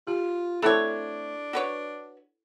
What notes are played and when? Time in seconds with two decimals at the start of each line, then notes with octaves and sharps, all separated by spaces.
0.07 F4 G4
0.62 A3 C4 D4 E4 A4 C#5 B5
1.53 F#4 B4 C#5